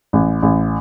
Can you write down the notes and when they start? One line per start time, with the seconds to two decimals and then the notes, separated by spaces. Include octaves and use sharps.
0.13 A1
0.42 A1